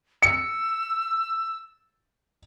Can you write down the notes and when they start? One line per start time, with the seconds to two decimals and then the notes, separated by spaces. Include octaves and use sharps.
0.22 E6 C#7